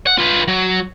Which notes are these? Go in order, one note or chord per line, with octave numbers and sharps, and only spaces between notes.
F#5
F4 B4
F#3